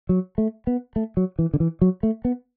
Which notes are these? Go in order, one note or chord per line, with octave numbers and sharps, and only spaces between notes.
F#3
A3
B3
A3
F#3
E3
D3
E3
F#3
A3
B3